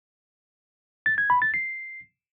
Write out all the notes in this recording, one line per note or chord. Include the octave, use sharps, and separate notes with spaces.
A6
G#6
B5
A6
C7